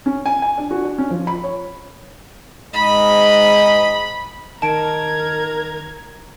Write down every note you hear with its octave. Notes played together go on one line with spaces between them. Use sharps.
C#4
G#5
G#5
D4
F#4
D4
C#4
F3
B5
C#5
G#2 D#5 B5
D#3 D#4 A#4 D#5 A5 A#5 G#6 D7